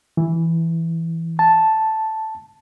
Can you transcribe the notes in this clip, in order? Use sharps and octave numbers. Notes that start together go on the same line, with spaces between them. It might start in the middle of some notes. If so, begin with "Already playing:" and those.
E3
A5